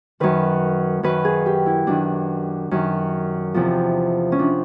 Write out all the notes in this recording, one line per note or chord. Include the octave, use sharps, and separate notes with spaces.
F#2 D#3 B4
F#2 D#3 B4
G#4
G4
E4
F#2 D#3 D4
F#2 D#3
E2 C3 F3
C#4
C3 F3 D4